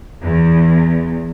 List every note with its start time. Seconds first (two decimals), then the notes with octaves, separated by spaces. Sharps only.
0.22 E2